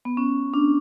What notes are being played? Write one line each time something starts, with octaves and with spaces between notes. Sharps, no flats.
B3
C#4
D4